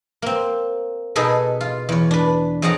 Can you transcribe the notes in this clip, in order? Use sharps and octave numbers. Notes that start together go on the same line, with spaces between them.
A#3 C4
B2 D#4 G#4 A4 B4
F4
E2 C#5
D4 B4
F2 G#4 C#5 D5 F#5 A#5